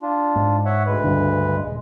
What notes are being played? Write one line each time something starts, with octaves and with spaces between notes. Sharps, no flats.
D4 F4
G#2
C#5 E5 F#5
D2 G#3 B4
C#2 G2 D3
D#1 G#3